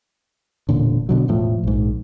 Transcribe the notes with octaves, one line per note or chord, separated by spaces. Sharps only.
E1 A#2 D3
B2 D3 F#3
E1 A2 F3
A#1 G#2